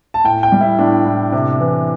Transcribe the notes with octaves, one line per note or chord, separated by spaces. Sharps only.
A5
A2 G5
G5
G3
E4
A2 D4
A2
C3
E3